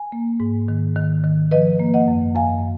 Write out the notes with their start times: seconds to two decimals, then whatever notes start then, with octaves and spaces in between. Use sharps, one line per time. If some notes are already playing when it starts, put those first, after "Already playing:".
Already playing: G#5
0.12 A#3
0.40 G#2
0.68 D#3
0.96 D#3
1.24 D#3
1.51 F3 B4 D#5
1.79 A#3
1.94 D#5 F#5
2.08 F#2
2.35 F#2 F5 G#5